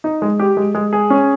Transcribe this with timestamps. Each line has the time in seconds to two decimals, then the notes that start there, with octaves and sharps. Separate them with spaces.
0.04 D#4
0.22 G#3
0.40 G4
0.57 G#3
0.75 G#3
0.93 G#4
1.10 C#4